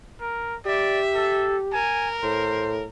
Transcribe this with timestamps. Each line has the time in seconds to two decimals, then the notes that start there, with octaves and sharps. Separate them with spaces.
0.21 A#4
0.66 G4 D5 E5
1.15 A4
1.73 A#4 G#5
2.23 A2 C5